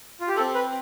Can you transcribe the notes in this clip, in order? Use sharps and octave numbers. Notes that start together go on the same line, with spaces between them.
F4
G4
C4 A4
B4